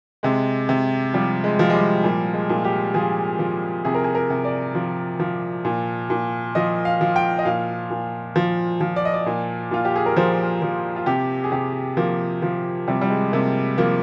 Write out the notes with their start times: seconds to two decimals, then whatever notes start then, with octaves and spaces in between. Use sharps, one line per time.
0.23 C3 G#3
0.69 C3
1.14 F3 G3
1.44 G#3
1.59 F3
1.70 G#3
1.74 G3
2.04 A#2 G3
2.34 G#3
2.49 A#2
2.64 G4
2.94 F3 G#4
3.39 F3
3.85 C3 G#4
3.94 A#4
4.04 G#4
4.15 A#4
4.30 C3
4.45 D5
4.75 F3
5.19 F3
5.65 A#2
6.10 A#2
6.55 F3 D#5
6.85 F5
7.01 F3
7.16 G5
7.39 D#5
7.45 A#2 F5
7.90 A#2
8.36 F3
8.81 F3
8.96 D5
9.05 D#5
9.14 D5
9.26 A#2
9.71 A#2 F4
9.85 G4
9.96 G#4
10.06 A#4
10.16 F3 C5
10.62 F3
10.96 F4
11.06 C3 G4
11.44 G#4
11.52 C3 G4
11.97 F3 A#3
12.42 F3
12.88 C3 G3
13.01 G3
13.10 G#3
13.32 C3 A#3
13.78 F3 A#3